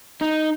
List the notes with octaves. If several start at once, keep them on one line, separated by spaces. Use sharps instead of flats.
D#4